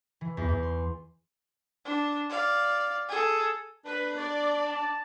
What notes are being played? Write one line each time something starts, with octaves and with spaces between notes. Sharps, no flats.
E3
E2
E2
C6
D4
D5 F5
G#4 A4
D4 B4
D5
A5